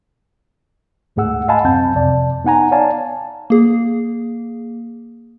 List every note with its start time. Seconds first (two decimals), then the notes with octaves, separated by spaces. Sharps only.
1.16 D2 G#2 A3 G#4 F#5 E6
1.48 D#5 F5 F#5 G#5 A5 B5
1.64 C2 F#2 C4 A5 G6
1.94 F2 C3 D5 A5
2.44 B3 D#4 F#5 G#5 A#5
2.71 C#5 D5 F5 G#5 A5
3.50 A#3 G#4